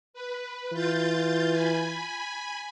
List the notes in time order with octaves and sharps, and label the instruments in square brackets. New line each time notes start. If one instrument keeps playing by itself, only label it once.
[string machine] B4
[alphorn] E3 [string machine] F4 G6 A6
[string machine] G#5 B5